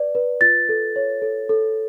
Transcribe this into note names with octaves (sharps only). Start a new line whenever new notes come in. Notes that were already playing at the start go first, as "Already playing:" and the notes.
Already playing: B4 D5
B4
F4 A6
A4
C#5
A4
A4